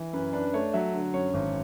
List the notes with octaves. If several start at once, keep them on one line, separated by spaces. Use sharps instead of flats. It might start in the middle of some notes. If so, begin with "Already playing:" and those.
Already playing: E3
F#2 B4
D4 B4
A3 C#5
F#3 E5
D3
F#2 C#5
G#1